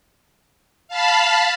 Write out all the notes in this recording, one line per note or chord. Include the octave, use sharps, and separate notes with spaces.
F5 A5 B5